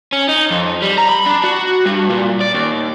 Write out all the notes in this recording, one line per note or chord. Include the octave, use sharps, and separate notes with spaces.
C#4
D#4
F2
G3
A#5
B5
D4
F#4
G2
A#2
D5
D#2